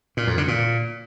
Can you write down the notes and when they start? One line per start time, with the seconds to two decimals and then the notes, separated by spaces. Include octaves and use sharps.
0.17 A#2
0.27 F2
0.38 D3
0.48 A#2